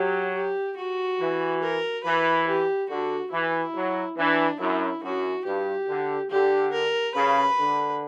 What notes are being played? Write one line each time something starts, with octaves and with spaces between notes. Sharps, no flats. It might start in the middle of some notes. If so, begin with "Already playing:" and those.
Already playing: F#3 G4
G4
F#4
E3
A#4
E3 B4
G4
D3 F#4
E3 E4
F#3
E3 D4
F#2 E4
F#2 F#4
G2 G4
D3
D3 G4
A#4
C#3 B4
D3